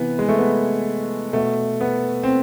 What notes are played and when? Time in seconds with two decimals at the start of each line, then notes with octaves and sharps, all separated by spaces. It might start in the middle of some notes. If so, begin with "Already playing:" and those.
Already playing: C3 E3 B3
0.19 G#3
0.29 A3
0.38 B3
1.33 B2 A3
1.81 B3
2.23 C4